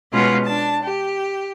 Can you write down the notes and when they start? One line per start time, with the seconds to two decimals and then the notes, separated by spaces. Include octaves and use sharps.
0.12 B2 G#3 B3 C#4 F4 F#5
0.45 D4 A5
0.83 G4